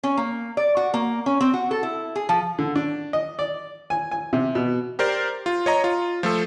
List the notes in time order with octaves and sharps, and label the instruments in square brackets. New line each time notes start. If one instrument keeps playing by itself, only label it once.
[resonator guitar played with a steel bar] C#4
A#3
D5
F#4
A#3
C#4
C4
F#4
A4
E4
G#4
F3
[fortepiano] D3
D4
D#5
D5
G#5
G#5
C3
B2
[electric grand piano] G4 A#4 C5 D5
F4
C#5 D#5 A#5
F4
F3 A3 A4